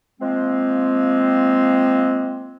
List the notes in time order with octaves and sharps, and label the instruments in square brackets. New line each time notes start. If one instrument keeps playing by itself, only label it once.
[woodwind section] F3 G#3 A#3 C4